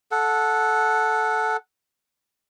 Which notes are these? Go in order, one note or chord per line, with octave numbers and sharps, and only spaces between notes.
A4 F#5